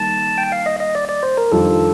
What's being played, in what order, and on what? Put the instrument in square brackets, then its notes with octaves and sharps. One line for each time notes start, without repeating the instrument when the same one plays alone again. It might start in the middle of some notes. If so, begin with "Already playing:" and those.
Already playing: [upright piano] D#3 G3 A#3 [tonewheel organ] A5
[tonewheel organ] G5
F5
D#5
D#5
D5
D5
C5
A#4
[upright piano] F2 D#3 G3 D4 F4 [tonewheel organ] A4